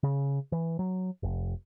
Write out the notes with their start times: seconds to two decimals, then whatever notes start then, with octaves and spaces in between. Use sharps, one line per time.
0.03 C#3
0.52 E3
0.79 F#3
1.23 F1